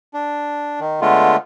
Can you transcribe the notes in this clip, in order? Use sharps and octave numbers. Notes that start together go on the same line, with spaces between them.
D4
D#3
D3 G#3 A3 B3 F4